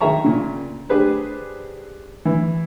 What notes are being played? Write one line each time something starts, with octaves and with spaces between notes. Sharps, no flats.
D#3 G#4 E5 A#5 C#6
A#2 C#3
D4 G4 G#4 B4 C5
E3